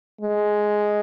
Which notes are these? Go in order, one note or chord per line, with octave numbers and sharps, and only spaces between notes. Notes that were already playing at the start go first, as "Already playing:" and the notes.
G#3